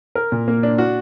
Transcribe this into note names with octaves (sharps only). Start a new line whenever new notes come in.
A#4
A#2
A#3
D4
F#4